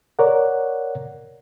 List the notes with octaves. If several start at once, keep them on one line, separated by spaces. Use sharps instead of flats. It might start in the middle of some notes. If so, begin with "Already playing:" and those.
A#4 C#5 D5 F#5